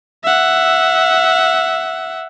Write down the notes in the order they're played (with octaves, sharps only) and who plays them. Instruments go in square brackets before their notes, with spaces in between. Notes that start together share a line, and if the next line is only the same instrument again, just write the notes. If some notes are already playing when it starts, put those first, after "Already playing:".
[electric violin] E5 F#5